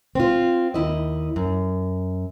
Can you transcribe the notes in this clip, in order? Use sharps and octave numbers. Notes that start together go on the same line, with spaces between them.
C4 F4
D#2 E4 D#5
F#2